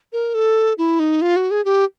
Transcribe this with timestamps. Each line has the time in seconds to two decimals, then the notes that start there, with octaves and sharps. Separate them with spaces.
0.13 A#4
0.35 A4
0.78 E4
1.00 D#4
1.22 F4
1.36 F#4
1.51 G#4
1.65 G4